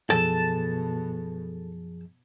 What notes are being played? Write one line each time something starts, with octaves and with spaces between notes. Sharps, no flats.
F#2 B2 F3 G#4 A4 A5